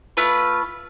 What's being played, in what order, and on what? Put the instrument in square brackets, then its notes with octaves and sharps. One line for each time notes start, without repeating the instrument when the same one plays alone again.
[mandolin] A3 F4 B4